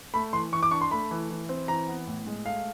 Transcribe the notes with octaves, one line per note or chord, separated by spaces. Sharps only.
A3 B5
E3 C6
E3 C#6
D6
D4 C#6
C6
A3 B5
E3
E3
C4
E3 A#5
B3
A2
G#3
A3 F5